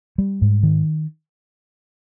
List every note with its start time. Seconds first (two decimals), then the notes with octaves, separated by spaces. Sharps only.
0.18 G3
0.42 G#2
0.63 D#3